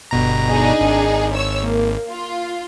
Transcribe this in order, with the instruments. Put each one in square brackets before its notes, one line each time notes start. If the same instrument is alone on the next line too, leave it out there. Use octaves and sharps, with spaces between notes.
[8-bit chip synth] G1 B2 A#5
[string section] D4 D#4 G#4
[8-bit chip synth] G#1
[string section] C#5 E6
A#3
F4